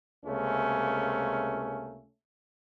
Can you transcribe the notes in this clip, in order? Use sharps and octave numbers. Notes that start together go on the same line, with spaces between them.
C#2 C3 A3 A#3 C#4